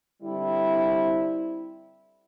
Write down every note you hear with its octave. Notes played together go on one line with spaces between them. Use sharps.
D3 G3 C4 E4